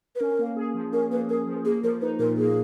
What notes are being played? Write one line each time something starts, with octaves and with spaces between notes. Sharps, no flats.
B4
C#4 A#4
A#3
G#4
F3
C#4 A#4
A#3 B4
G#4 A#4
F3
A#3 G#4
F3 A#4
D#4 B4
A#2 A#4
A#3 G#4